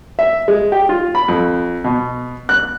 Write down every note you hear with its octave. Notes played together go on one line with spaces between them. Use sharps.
E5
G#3
G4
F4
B5
F2
B2
F#6